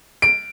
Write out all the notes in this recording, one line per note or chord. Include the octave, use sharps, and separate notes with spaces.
D7